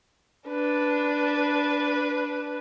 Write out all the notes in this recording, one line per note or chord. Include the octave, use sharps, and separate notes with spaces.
D4 B4